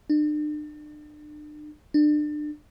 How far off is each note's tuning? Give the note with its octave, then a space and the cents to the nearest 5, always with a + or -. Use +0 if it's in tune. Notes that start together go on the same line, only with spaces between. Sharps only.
D4 +40
D4 +30